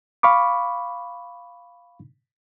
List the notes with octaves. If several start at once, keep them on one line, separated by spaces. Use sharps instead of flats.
F5 B5 C#6 D6